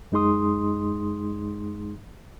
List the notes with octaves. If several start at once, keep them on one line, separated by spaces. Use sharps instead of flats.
F#2 G#3 D#4 G#4 C6 D#6